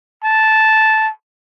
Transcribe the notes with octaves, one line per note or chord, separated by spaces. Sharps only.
A5